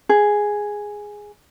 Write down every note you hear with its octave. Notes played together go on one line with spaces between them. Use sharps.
G#4